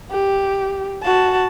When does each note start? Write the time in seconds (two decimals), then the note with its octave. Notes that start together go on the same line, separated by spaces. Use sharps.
0.11 G4
1.03 F#4 A5